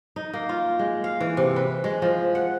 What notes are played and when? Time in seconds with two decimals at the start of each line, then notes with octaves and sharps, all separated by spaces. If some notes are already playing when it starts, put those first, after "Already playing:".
0.16 D#4
0.33 A#3
0.49 F4
0.79 G#3
1.04 F5
1.21 E3
1.37 C3
1.56 B4
1.84 G#3
2.02 F3
2.35 F#5